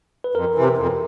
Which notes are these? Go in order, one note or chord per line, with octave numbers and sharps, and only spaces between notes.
B4
F2 A#4
C3 E3
F2